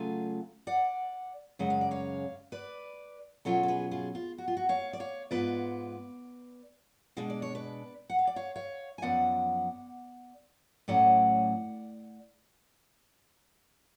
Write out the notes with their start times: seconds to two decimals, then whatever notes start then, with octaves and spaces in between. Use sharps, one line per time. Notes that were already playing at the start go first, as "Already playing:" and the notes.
Already playing: C#3 F#3 A3 F4 F5 G#5
0.67 D5 F#5
1.59 F#2 C#3 G#3 F#5
1.70 F5
1.81 D5
1.91 C#5 F5
2.52 B4 D5
3.45 B2 F#3 C#4 F4 A4 C#5
3.63 A4
3.68 G#4 B4
3.91 F4 G#4
4.15 F4
4.38 F#4
4.48 F4
4.57 F#4
4.69 C#5 F5
4.93 D5
5.00 C#5 F5
5.31 G#2 G#3 B3 F4 B4 D5
7.17 B2 G#3 D4 F5
7.30 D5
7.42 C#5
7.55 B4 D5
8.10 F#5
8.19 F5
8.27 D5
8.36 C#5 F5
8.56 C#5 F5
8.98 G#5
9.02 F#2 F3 B3 D5 F#5
10.88 A2 F#3 C#4 D5 F#5